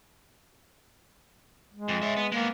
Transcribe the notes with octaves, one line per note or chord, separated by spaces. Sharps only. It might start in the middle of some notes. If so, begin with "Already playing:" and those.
G#3
F2
C#5 E5
B3
G#3 A#3 B3